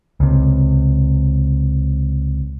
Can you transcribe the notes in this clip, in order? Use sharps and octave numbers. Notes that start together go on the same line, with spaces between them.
C#2 C3